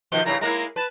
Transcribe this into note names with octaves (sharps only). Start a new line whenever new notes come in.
B2 D#3 F3 G7
G2 C#3 E4 A#5
G#3 A#3 E4 A#5
B4 A5